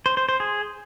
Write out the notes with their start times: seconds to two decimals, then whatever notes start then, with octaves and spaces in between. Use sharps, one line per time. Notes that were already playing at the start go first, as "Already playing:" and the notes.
0.06 C5
0.17 C5
0.29 C5
0.40 G#4